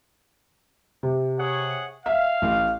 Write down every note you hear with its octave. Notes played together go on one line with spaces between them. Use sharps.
C3
G#4 C#5 F#5
E5 F5
A1